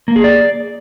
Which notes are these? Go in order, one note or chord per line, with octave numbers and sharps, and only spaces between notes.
A#3
G#4
D5